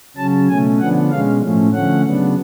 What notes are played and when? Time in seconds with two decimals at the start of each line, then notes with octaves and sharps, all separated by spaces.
0.16 C#3 F#3 C#4 A5
0.48 B2 A3 C#4 G#5
0.79 D3 F3 B3 D4 F#5
1.10 B2 G#3 C#4 F5
1.41 A2 F3 A3 C#4
1.73 D3 F3 A3 C#4 F#5
2.04 C#3 F#3 B3 D4